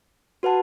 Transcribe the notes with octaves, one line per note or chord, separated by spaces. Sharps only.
F#4 B4 F#5 A5